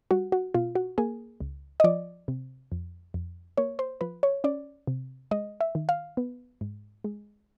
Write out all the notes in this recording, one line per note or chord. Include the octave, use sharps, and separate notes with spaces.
G3 F#4
F#4
B2 F4
F#4
A#3 G#4
C#2
D#5
F3 D5
C3
F2
F2
A#3 C#5
C5
F3 B4
C#5
C#4 D5
C3
G#3 D#5
E5
D#3
F5
B3
G#2
G#3